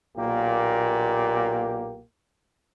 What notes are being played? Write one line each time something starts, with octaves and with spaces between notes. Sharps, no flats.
B1 A#2 A#3 G4